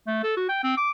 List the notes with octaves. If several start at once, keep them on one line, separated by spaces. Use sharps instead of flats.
A3
A4
F#4
G5
C4
D6